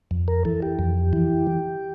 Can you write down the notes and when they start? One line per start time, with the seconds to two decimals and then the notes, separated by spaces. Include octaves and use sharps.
0.11 F2
0.28 A#4
0.45 E3 A4
0.62 G4
0.79 F2
1.13 E3